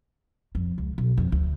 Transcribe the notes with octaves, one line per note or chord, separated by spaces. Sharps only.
F2
C#2
B1
F2
D2